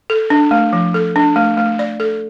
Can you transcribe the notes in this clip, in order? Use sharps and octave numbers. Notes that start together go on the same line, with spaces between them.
A4
D4
A3
F3
A4
D4
A3
A3
D5
A4